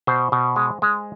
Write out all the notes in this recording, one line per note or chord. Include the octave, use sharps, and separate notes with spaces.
B2 C5
B2
G#3
G#3